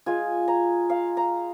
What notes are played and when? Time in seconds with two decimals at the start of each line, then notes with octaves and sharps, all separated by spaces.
0.06 G#3 F4 G#5
0.48 A#5
0.90 F5
1.17 A#5